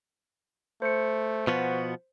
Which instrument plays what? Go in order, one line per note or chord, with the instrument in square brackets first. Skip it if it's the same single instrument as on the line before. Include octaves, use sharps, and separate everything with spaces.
[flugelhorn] A3 [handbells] C5 C#7
[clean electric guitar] B2 F3 B3 [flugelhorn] F#4